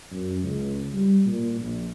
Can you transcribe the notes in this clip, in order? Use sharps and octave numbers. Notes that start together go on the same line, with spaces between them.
F#2
C#2
G3
A#2
A#1